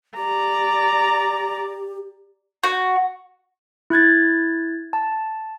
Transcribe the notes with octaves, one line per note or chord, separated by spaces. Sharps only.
G4 D5 A#5
F#4
E4 F#6 G#6 A6
A5